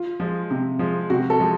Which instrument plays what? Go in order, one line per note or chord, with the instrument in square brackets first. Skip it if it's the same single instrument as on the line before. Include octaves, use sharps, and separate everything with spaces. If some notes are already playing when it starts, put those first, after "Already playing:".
Already playing: [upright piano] F4
[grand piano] F3 G#3
C3
F3 G#3
[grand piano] C3 [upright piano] F#4
[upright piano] A4
[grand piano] F3 G#3